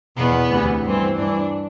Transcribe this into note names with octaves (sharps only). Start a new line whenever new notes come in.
E2 B2 B3
D2 C3 E3
G2 E3 C4
G2 E3 D4